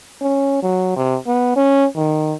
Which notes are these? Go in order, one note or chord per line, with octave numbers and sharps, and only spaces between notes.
C#4
F#3
C3
B3
C#4
D#3